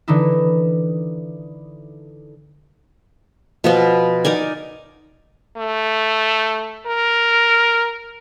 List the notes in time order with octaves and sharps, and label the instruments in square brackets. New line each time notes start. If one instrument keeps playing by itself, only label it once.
[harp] D3 E3 D#4 E4
[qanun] B2 F3 B3
D#4 A#4 D5 G#5
[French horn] A3
A#4